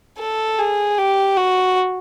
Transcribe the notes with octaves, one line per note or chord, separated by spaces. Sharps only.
A4
G#4
G4
F#4